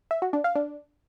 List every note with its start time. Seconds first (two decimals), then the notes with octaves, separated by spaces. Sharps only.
0.11 E5
0.22 F#4
0.33 D4
0.44 F5
0.55 D4